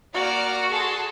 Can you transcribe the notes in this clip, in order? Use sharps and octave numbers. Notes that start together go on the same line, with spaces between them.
A#3 F#4 D5 F6
G#4 A4 C6